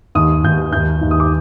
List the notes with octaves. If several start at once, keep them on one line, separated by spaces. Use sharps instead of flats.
D#2 D#3 D#6
D#2 D#3 G6
D#2 D#3 G6
D#2 D#3
D#6
D6